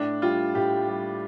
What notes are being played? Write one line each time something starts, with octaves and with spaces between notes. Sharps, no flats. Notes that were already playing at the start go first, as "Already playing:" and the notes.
Already playing: A2 D4
G3 F4
A2 G4
G3